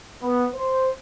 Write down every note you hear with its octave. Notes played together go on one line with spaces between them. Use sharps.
B3
C5